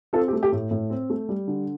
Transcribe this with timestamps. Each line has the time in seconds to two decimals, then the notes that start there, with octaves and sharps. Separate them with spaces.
0.13 C4 F4 A4
0.28 G4
0.33 A3
0.43 G4
0.52 A2
0.71 A2
0.90 C4
1.10 A3
1.29 G3
1.48 D3